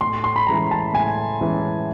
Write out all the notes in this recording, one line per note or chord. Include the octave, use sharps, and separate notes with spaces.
A2 C6
C6
B5
E3 G#3 C#4 A#5
A5
A2 G#5
E3 G#3 C#4